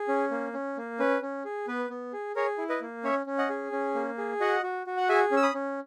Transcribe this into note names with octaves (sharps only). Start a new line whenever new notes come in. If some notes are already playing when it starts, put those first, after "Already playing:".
Already playing: G#4
C#4
A#3
C#4
A#3
C#4 B4
C#4
G#4
B3 B4
B3
G#4
G#4 A#4 C#5
E4
B4 D#5
A#3
C#4 C#5 E5
C#4
D#5 F#5
G#4
C#4
A#3
G#4
F#4 D#5 F#5
F#4
F#4
F#5
G#4 E5 G#5
C#4
E6
B5 D#6
C#4